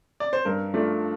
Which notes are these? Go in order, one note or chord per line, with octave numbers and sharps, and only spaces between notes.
D5
C5
G2 A#4
F3 A3 D4